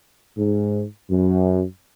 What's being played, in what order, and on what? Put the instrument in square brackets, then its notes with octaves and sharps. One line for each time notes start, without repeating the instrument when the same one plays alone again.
[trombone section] G#2
F#2